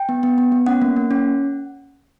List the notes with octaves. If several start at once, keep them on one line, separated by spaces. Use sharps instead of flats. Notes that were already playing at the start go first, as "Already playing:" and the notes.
Already playing: G5
B3
B3
B3
B3
C#4 F#5
A#3
A#3
C#4